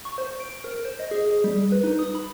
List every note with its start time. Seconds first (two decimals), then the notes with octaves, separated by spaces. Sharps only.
0.05 C#6
0.18 C5
0.40 D7
0.64 A#4
0.85 C5
0.99 D#5
1.11 G#4
1.44 G3
1.72 B4
1.84 D#4
1.99 D#6
2.15 B5